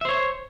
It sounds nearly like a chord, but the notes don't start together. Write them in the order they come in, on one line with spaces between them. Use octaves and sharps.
E5 C5 C#5